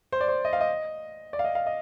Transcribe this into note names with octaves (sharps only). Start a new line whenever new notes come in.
C5
D5
C5
D#5
F5
D#5
D5
F5
D#5
F5
D#5